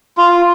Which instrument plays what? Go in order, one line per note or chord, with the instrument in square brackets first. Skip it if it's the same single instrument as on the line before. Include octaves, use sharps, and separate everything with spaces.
[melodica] F4